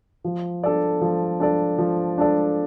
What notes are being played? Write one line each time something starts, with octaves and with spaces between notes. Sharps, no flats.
F3
D4 A4 D5
F3
D4 A4 D5
F3
D4 A4 D5